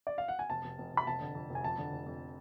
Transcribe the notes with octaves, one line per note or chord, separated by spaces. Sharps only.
D5
F5
F#5
G#5
F1 A5
F1
F1
F1 B5
F1 A5
D3
F2
F1
G#5
F2 A5
D3
F1
F2